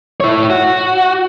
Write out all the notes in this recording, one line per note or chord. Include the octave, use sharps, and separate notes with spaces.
E4 C#5
F#4